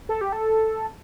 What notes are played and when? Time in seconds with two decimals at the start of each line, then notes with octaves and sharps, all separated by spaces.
0.09 A4
0.21 G4
0.32 A4